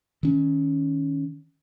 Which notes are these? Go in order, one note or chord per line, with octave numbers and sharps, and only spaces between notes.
D#3 C#4